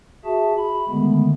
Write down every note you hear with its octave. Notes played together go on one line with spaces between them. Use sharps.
F#4 G#4 E5 A5
B5
D3 D#3 G#3 A3 B3